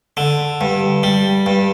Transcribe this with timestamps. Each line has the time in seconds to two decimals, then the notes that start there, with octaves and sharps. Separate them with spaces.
0.17 D3
0.61 G2
1.03 G3
1.46 G2